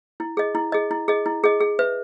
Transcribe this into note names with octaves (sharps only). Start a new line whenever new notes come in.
E4
G#4 D#5
E4
G#4 D#5
E4
G#4 D#5
E4
G#4 D#5
G#4
B4 E5